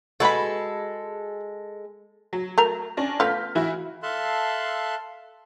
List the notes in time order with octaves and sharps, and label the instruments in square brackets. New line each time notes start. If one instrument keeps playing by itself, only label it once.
[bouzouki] G#3 A4 [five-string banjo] F#4 B4 B5
[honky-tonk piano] F#3
[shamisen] A3 A#4 A#5
[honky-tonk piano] C#4 D4 A#6
[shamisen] A3 B3 F4 [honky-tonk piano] F6 G6 B6
[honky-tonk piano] E3 E4 F#4
[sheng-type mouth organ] A4 E5 F5 A5 C6 F#6